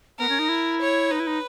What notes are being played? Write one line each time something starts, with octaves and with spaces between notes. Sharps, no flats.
B3 A#4
C#4
D#4
E4
C#5
D#4 B4
E4
D#4